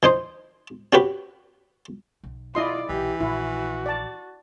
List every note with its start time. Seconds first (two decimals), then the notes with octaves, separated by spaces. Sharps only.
0.03 E3 D#4 C5
0.93 C#4 F#4 G4 B4
2.24 B1
2.55 E4 F4 D5 D#5 C6
2.89 B1 A#2 E3 G4
3.20 A#1 E4 F#4
3.86 D5 A5